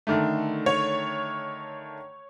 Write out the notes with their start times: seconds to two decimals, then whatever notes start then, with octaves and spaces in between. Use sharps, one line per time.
0.07 D3 D#3 A3
0.66 C#5